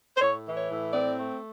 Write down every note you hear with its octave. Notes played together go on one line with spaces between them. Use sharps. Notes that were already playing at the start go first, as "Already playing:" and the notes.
C5
A2 C#5
E3
C#5
A2
C4 D5
A3